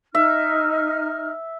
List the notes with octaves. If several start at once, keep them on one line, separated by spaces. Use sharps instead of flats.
D#4 E5 F6